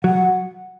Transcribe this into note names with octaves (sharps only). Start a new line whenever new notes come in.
F#3 F#5